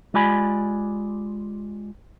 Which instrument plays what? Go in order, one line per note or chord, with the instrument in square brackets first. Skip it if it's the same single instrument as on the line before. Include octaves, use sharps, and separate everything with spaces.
[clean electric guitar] G#3 F4 G4 D5 G#5 B5